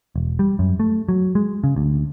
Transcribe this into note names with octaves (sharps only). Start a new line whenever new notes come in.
E1
G3
F#2
A3
F#3
G#3
C#3
D2